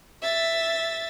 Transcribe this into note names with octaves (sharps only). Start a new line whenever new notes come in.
E5 A6